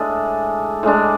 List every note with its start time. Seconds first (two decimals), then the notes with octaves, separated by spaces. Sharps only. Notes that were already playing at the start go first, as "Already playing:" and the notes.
Already playing: A2 G#3 D4 A4
0.83 A2 G#3 D4